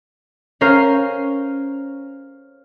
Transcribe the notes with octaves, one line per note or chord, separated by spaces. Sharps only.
C#4 A#4 C5 F5